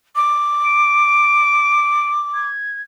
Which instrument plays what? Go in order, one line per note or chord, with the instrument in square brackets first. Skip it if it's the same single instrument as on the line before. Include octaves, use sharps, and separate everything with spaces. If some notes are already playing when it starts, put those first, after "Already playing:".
[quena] D6
[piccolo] D7
G#6